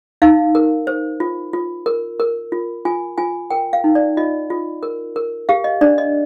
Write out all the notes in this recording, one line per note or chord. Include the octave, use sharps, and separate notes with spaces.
D#4 F5
A#4
C5
F4
F4
A#4
A#4
F4
F4 G#5
F4 G#5
A#4 G5
F5
D#4
D5
F4 D#5
F4
A#4
A#4
G4 F5
D#5
D4 D5
D#5